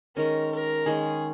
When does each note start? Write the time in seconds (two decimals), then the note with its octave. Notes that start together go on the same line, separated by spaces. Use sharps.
0.16 D#3 G#3 C#4 A#4
0.51 A#4
0.86 D#3 G#3 C#4 G#4